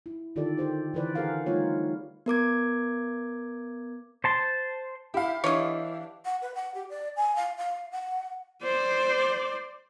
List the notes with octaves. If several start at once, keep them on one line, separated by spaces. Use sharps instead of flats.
E4
D3 D#3 F4 G4 A4 D5
G4 C5 D5
D3 E3 E4 B4 C5 D5
G4 G#4 A#4 C5 F5 F#5
G3 A3 C4 D#4 F4 C#5
B3 A#4 D6 G#6
C5 A5 C6
E4 G4 F5
E3 D4 C#5 D#5
F#5
B4
F#5
G4
D5
G#5
F5
F5
F#5
C5 D5